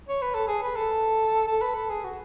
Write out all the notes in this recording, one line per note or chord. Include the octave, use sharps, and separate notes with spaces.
C#5
B4
A4
G#4
B4
A4
A4
B4
A4
G#4
F#4